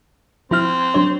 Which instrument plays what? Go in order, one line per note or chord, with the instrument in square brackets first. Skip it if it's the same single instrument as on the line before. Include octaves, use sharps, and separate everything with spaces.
[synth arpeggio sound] F3 E4 F6 [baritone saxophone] C4
[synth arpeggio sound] F#3 D4 C#5